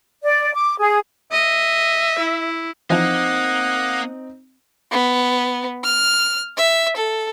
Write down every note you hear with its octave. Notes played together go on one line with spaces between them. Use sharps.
D5
D6
G#4
D#5 E5
E4
E3 F3 A#3 C4 D#4 F#5 D#6
B3
F6
E5
A4